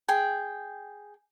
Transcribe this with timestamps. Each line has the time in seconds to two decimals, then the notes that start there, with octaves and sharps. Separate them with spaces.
0.08 G#4 G5